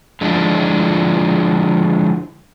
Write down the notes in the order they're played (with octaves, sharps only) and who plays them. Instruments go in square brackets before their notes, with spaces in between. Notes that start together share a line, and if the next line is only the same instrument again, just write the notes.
[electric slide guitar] D3 F3 G#3 D4 E4 F4